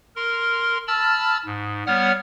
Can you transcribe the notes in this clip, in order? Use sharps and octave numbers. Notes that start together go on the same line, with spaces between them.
A#4 C6
A5 B5 E6 F6 A6
G#2
G3 B3 C#5 F#5 F6